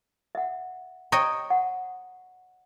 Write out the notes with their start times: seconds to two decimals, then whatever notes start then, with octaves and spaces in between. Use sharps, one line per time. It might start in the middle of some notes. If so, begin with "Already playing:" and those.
0.35 E5 F#5
1.12 C#5 D#5 G5 A#5
1.50 F#5